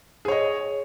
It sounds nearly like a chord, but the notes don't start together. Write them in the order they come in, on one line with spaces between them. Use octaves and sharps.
G#4 C#5 D#5